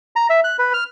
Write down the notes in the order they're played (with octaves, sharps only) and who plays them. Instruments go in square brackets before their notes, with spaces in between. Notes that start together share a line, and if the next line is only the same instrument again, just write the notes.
[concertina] A#5
E5
F#6
B4
F6